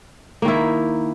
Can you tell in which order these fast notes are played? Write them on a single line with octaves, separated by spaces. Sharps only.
A#3 D#3 E4